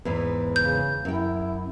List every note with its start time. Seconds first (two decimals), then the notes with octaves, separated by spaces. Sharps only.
0.05 E2 G#2 E3
0.56 C#3 G6
1.05 F#2 E4 G5